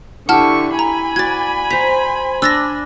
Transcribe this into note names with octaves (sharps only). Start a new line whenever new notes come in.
D3 E4 G4 F#5 A5 C#6 F6
G#5 A#5 B5
F#4 D5 G#6 A6
C5 A#5 B6
D4 E6 A6 A#6